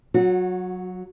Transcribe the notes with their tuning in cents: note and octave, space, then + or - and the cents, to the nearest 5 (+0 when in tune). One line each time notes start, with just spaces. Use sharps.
F#3 +0 F#4 -30